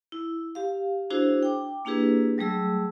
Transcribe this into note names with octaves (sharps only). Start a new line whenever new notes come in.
E4
G4 F5
D4 E4 F#4 G#4 C5
G5 D6
A#3 D4 E4 G4 G#4 B4
F#3 G3 A3 G#4 E6